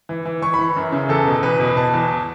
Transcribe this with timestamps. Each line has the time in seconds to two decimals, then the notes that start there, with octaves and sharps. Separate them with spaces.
0.09 E3
0.25 E3
0.42 E3 C#6
0.54 B5
0.59 E3
0.76 F#2
0.92 C#3
1.09 E2 A4
1.26 B2
1.43 E2 B4
1.60 B2
1.77 B2 A5
1.94 E2